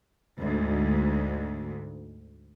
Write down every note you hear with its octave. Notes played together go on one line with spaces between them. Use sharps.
D2 G#2